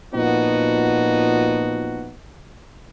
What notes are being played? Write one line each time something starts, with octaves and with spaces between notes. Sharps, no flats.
A#2 F3 B3 D#4 F#4